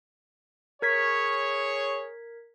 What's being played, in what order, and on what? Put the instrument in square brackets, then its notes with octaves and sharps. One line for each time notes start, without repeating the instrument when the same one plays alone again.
[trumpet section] G#4 C#5 [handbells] A#4 G#6 B6